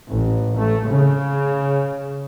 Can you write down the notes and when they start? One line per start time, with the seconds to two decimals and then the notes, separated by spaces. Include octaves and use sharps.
0.13 A1
0.59 A3
0.87 C#3